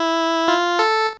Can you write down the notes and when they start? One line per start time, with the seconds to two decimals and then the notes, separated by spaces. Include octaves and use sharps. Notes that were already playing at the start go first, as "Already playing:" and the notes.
Already playing: E4
0.48 F4
0.79 A4